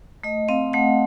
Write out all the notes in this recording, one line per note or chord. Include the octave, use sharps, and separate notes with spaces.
A3 D#5
C4 F5
A3 F#5